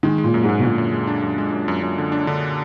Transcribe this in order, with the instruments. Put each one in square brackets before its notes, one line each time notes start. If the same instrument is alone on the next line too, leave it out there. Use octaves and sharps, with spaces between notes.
[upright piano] D#3 [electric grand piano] G#3
[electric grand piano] G#3
[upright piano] A#2
[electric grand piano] F#2
[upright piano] G#2
[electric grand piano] F#2
[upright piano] B2
[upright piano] A#2 [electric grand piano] D3
[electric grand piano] F#2
G#3
D4
F#2
G#3
F#2
F#2
F#2
D3
D4
D3